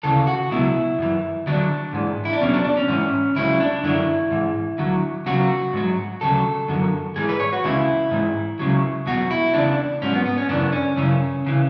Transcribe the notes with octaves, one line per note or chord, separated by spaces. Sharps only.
D2 C#3 E3 A4
F#4
C#2 B2 F#3 E4
F#2 E3
D2 D3 F#3 D4
G#2 E3
E4
D4
E2 B2 F#3 C#4
D4
D4
C#4
G#2 E3 C#4
C#2 C#3 F#3 E4
D4
F#2 D3 F#3 E4
G#2 E3
D2 D3 F#3
E2 C#3 F#3 F#4
G#2 F#3
D2 C#3 F#3 A4
F#2 D3 F#3
G#2 E3 G#4
B4
C#5
F#4
C#2 C#3 E3 E4
G#2 E3
C#2 C#3 F#3
E2 B2 F#3 F#4
E4
E2 C#3 E3 D4
G#2 F#3 C#4
B3
B3
C#4
F#2 C#3 E3 D4
C#4
F#2 C#3 E3 C#4
C#3 E3